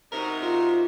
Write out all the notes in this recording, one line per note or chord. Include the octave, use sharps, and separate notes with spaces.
C3 D#4 F#4 A#4
F4 A#4